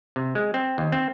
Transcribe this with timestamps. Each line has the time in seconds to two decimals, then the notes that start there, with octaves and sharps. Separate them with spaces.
0.16 C3
0.35 G#3
0.54 C4
0.78 D#2
0.92 C4